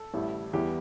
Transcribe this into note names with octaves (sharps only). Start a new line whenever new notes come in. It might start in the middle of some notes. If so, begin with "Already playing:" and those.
Already playing: A4
A1 A2 G3
E2 E3 G3 G4